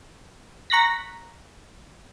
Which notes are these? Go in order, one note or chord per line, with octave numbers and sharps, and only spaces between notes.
A#5 C#6 F#6 A#6 B6